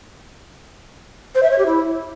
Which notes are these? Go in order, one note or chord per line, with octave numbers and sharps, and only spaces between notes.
C5
E5
C#5
G4
E4